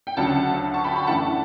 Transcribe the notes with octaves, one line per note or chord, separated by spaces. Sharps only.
G5
D2 C#3 F#3 F#5 A5
A5 C#6
G5 B5
G5 B5
F#2 E3 A3 D4 F#5 A5